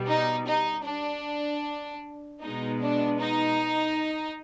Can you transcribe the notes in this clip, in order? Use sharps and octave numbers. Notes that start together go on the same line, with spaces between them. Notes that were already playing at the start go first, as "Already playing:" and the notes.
Already playing: B2 G3 B3
D#4
D#4
D4
B2 G#3 B3 D#4
D4
D#4